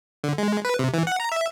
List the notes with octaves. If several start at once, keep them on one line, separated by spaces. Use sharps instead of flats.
D3
G#3
B4
C3
E3
F#5
A#5
E5